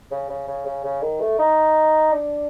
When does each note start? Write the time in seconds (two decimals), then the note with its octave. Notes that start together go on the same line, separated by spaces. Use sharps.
0.11 C#3
0.30 C#3
0.48 C#3
0.66 C#3
0.84 C#3
1.02 D#3
1.21 A3
1.39 D#4
2.13 D4